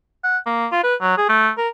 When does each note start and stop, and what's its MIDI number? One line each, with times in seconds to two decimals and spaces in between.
0.24 0.37 78
0.46 0.67 58
0.72 0.81 65
0.83 0.95 71
1.01 1.16 54
1.18 1.29 68
1.29 1.50 57
1.58 1.68 70